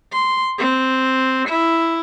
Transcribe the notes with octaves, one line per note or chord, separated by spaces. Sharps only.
C6
C4
E4